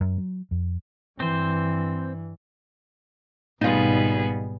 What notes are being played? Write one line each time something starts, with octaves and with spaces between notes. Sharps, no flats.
F#2
F#3
F2
G2 E3 C4 C5
G#1 B2 G3 B3 D#4 F4 G#4